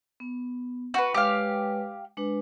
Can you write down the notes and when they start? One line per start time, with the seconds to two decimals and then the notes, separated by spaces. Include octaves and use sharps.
0.20 B3
0.94 F#4 B4
1.14 G#3 G4 B4 C#5 F5
2.17 G#3 D4 B4